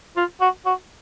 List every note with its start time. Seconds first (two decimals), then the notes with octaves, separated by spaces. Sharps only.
0.17 F4
0.41 F#4
0.66 F#4